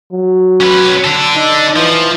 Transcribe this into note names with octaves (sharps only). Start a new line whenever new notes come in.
F#3
C#4 B4
D4 A4
D#4
E3 F3